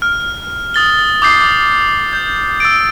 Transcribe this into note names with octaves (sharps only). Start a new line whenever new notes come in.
F6
D#6 A6 G7
D6 D#6 G6 A6 C7
G6
E6 A6 D7